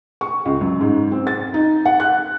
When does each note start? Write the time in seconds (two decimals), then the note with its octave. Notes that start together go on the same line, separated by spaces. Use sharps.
0.21 C#6
0.45 C#2
0.61 F#2
0.81 G#2
1.11 C4
1.27 A6
1.54 D#4
1.86 F#5
2.00 F#6